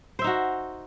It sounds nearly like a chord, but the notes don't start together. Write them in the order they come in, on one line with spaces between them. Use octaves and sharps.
C5 E5 D#4 F#4